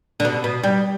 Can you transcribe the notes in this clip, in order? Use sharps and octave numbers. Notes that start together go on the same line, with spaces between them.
D3
B2
B2
G3